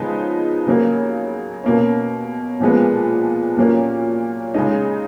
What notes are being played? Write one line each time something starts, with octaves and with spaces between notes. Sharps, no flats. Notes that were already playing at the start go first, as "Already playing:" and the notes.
Already playing: C#3 F3 G#3 B3 D#4
C#3 F#3 A#3
B2 A#3 C#4
A#2 F3 G#3 B3
A#2 F#3 A#3 C#4
C#3 G#3 D#4